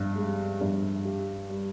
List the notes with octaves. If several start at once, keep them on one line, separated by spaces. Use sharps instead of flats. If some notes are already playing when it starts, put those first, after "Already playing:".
Already playing: G2
G#3
G2
G4
G3